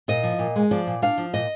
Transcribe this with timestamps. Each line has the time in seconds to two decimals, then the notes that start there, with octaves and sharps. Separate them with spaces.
0.08 A#2 D#5
0.24 F3
0.39 A#2
0.56 G#3
0.71 F3 D5
0.87 A#2
1.02 D4 F5
1.18 F3
1.34 A#2 D#5